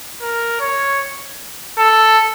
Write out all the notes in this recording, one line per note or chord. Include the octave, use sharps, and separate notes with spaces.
A#4
C#5
A4